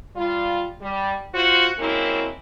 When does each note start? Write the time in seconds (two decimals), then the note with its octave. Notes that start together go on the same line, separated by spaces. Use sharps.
0.16 G3 F4
0.81 G3
1.34 F4 F#4 C5
1.79 F#3 G#3 A#3 C4 C#4 E4